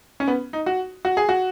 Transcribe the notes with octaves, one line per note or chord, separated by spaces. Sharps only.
C#4
B3
D#4
F#4
F#4
G#4
F#4